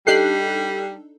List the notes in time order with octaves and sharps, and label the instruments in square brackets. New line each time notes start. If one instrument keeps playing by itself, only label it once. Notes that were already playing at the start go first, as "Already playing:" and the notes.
[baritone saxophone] G3 [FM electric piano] D4 D#4 A4 [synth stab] G4 F#6 C7